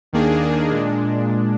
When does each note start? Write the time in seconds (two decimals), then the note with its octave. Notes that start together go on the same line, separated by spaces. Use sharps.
0.13 D#2 D#3 A#3 D4 G#4
0.70 A#2 G#3 D4